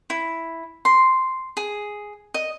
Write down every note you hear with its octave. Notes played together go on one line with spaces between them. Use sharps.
E4
C6
G#4
D#5